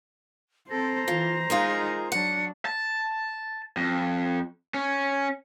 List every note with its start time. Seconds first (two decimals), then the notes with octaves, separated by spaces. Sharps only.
0.70 C4 A4 C5 A#5 A#6
1.08 E3 F4
1.50 G#3 D#4 F4 G#4 A#4
2.12 F#3 D4 F#5 C#7
2.65 A5
3.77 F2
4.74 C#4